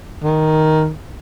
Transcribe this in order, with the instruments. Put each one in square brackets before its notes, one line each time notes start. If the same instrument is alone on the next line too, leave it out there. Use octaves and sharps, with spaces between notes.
[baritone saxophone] D#3